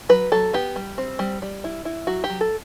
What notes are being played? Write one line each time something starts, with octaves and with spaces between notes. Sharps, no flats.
F#3 B4
F#3 A4
B3 G4
G3
C4
G3
G3
E4
E4
F#3 F#4
G4
F#3
A4